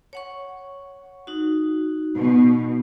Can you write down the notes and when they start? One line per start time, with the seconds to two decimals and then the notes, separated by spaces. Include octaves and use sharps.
0.13 C#5 F#5 C#6
1.27 D#4 F#4
2.18 B2